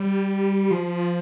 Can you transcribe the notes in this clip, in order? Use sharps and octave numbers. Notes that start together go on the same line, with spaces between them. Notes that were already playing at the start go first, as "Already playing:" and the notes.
Already playing: G3
F3